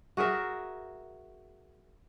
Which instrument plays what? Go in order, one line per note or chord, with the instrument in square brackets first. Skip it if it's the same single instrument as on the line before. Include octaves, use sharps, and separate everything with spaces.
[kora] F#4 G#4 A#4 E5